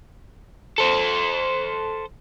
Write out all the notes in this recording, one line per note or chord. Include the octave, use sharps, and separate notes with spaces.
A4 C5